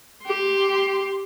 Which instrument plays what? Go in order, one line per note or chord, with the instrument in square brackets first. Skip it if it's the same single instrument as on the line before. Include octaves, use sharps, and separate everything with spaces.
[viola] G4 C6